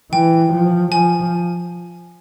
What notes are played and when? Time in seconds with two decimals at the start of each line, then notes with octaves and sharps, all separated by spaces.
0.12 E3 G5
0.53 F3
0.92 F3 G#5